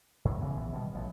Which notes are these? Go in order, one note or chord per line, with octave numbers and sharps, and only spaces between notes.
G#2
C#3 E3 B3
A#1 E3 B3
B2 D#3 G3
A1 F3